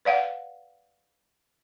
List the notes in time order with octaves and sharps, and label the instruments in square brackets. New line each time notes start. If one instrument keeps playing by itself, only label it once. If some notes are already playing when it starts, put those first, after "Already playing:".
[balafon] B4 D5 F5 F#5